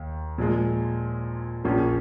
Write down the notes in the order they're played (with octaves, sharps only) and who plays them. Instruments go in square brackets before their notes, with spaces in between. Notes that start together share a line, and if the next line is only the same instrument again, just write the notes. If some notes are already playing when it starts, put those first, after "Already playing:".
Already playing: [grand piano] D#2
A#2 F3 G#3
A#1 A#2 F3 A#3 C#4